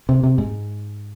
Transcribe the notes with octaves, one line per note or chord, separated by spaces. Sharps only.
C3
C3
G#2